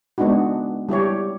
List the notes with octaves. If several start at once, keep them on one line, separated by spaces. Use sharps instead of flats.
G#3 B3 D4 D#4 F#4
G3 E4 G4 C#5